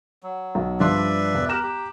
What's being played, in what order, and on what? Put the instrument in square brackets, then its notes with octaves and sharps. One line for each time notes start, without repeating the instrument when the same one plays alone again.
[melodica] F#3
[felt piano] B1
[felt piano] G2 F3 C6 [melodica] B4 D5 E5
[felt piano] E1
[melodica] G4 A#4 [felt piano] A#5 F#6 E7
[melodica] G4